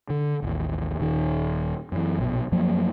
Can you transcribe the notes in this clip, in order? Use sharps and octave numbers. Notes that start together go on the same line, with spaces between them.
D3
A1 D#2
D#1 D#3
F#2 E3
A#1 B2
F#2 F3 F#3 A#3